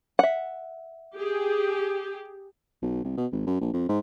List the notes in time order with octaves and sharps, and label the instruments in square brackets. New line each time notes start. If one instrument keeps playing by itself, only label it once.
[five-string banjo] E5 F#5
[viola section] G4 G#4
[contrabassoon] B1
C2
B2
G#1
F#2
A#1
F2
G#2